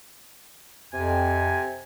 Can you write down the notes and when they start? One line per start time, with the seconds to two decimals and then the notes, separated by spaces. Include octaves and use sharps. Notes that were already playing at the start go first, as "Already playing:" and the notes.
0.93 F2 C3 G#5